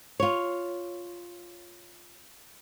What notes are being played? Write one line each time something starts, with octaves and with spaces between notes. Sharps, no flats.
F4 C#5